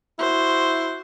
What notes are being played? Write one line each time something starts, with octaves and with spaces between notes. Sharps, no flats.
E4 F#4 C5